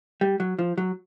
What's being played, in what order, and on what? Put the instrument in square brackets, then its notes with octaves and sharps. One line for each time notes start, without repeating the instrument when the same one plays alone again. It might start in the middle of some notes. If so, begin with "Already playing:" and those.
[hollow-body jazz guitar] G3
F#3
F3
F#3